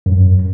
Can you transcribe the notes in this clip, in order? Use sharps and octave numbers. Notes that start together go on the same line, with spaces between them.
F#2